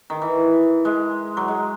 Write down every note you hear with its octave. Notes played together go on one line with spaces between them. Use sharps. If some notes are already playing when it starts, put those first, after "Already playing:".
D#3
E3
G#3
F#3
G#3